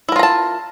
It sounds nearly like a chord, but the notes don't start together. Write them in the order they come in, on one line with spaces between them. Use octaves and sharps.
E4 A#4 F4 A#5 A5